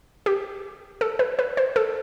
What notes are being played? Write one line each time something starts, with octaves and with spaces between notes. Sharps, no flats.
G4
A4
B4
B4
C5
A4